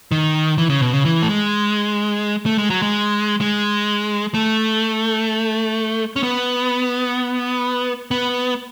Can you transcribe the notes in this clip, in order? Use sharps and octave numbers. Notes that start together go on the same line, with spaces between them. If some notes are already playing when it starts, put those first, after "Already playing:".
D#3
E3
C#3
B2
C#3
E3
A3
G#3
A3
G#3
F#3
G#3
G#3
A3
C#4
B3
B3